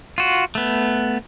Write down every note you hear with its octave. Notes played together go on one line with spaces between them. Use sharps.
F4 F#4
A3 B3